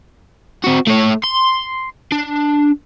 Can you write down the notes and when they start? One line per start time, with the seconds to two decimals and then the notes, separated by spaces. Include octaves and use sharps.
0.64 C4 F#4
0.88 A3 C#5
1.24 C6
2.12 D4